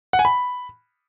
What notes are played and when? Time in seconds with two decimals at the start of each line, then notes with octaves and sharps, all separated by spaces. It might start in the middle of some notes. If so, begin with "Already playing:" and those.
0.13 F#5
0.19 G#5
0.25 B5